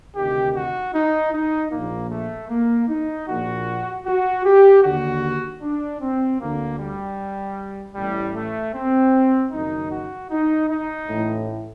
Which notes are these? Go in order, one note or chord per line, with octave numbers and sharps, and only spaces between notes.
D2 C3 D#3 G4
F#4
D#4
D#4
A#1 A#2 A#3
A3
A#3
D#4
A#1 A#2 F#4
F#4
G4
D#2 D3 F#4
D4
C4
D2 D3 A#3
G3
A1 A2 G3
A3
C4
F#1 F#2 D#3 D#4
F#4
D#4
D#4
A1 A2